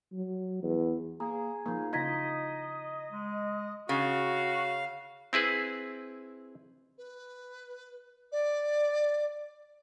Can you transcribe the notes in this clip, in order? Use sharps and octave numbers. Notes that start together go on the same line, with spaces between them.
F#3
E2
A#3 G#4 A#5
F3 A#3 D#4
C#3 E4 F4 D#5 A#5 G#6 B6
G#3
C#3 F#4 F5
C4 E4 G#4 B4
B4
D5